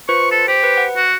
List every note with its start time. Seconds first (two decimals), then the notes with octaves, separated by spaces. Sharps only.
0.09 F4 B4 C5 C#6
0.32 A4
0.48 G4 C5
0.63 B4
0.77 F#5
0.97 F#4